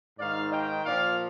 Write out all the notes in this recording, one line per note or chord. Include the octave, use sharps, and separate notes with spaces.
G#2 D#3 D5 F5
D#5 G5
A#2 F3 D5 F5